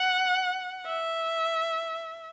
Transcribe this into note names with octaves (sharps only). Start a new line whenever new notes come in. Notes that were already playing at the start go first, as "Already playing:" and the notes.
Already playing: F#5
E5